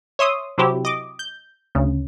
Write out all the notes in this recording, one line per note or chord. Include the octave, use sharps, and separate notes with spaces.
C#5 E5 C6 D#6
C3 F#3 C4 E4 G4
D#5 D6
G6
D2 C#3